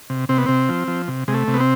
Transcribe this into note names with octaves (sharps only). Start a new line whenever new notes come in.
C3
C3 C4
B3
C3 C4
F3
F3
C3
C3 G#3
A3
C3
B3
C4